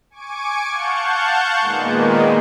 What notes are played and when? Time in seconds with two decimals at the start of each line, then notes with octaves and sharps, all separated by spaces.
0.10 G#5 C#6 D6 G#6 D7
0.68 F5 F#5 A5 C#6 G6
1.61 A#2 D#3 G#3 A#3 B3